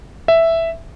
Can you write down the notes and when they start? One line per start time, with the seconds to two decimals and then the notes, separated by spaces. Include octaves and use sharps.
0.28 E5